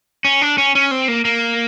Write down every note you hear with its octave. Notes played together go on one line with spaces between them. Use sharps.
C#4
D4
C#4
C#4
C4
A#3
A#3